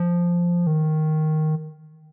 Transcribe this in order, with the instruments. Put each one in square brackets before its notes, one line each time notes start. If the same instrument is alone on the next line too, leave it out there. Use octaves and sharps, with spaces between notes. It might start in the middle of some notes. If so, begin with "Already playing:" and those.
Already playing: [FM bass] F3
D#3